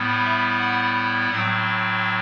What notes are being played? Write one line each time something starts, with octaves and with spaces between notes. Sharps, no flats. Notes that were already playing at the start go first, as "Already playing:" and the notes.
Already playing: A2 G3 B3 E4
E5
F#5
A2 F#3 C4 F#5